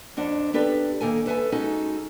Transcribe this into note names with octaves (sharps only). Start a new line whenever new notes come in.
F2 D4 F#5
B3 D4 G4 A4 B4
D#3 A#3 A4 G#5
A4 B4 E5 F#5 G#5
G#3 C#4 D#4 F#4 G#4 A4